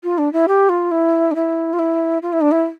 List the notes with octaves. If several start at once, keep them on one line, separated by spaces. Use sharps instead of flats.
F4
D4
E4
G4
F4
E4
D4
E4
F4
E4
F4
E4
D4
E4